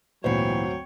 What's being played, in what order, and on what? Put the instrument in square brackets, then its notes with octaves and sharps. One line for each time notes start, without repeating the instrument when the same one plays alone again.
[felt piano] G#1 D2 C5 [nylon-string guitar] A#2 E3 [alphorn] F#3 [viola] C#5 G5